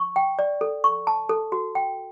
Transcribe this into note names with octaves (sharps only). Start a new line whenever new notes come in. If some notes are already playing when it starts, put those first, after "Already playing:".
Already playing: C#6
G5
D5
A4
C#6
A5
A4
F#4
G5